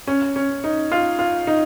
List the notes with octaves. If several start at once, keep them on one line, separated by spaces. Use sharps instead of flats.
C#4
C#4
D#4
F4
F4
D#4